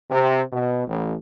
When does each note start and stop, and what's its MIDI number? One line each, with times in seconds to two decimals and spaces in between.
0.11 0.41 48
0.52 0.83 47
0.87 1.15 33